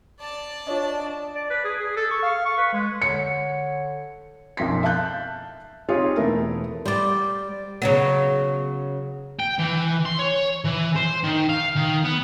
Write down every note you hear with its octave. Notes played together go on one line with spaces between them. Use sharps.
D5 A5
D4 F4 C#5 D#5
D5
B4
G#4
G#4
A4
C#6
F5
C#6
B4
G#3
D3 C#5 C#7
B1 F#2 F3 G5 C6 B6
E5 F5 A5 F#6 G6
C4 D#4 F4 G4 G#4 C#5
E1 A3 B3 E4 A#4
G3 C5 D5
C#3 F#3 B3
G5
E3
C6
C#5
E3
C5
D#3
F5
D#3
B3